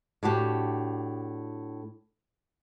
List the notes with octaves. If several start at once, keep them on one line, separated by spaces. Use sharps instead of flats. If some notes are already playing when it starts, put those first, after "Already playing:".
A2 D4 F#4 G4